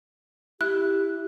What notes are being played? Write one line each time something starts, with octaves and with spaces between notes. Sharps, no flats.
E4 G4 F#6